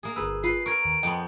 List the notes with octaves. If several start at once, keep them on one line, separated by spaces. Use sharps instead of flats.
A#3 G#4
G1 G#4 B4 E6
F4 B4 C7
A#4 C#6 G#6 D7
D#2
F2 B3 D#5 G5 C6